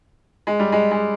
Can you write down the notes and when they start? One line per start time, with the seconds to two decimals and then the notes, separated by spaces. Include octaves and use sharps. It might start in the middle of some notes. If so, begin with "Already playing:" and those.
0.47 G#3
0.59 G3
0.72 G#3
0.91 G#3